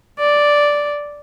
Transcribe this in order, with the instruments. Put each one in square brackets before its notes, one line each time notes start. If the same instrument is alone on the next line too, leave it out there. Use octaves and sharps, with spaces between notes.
[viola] D5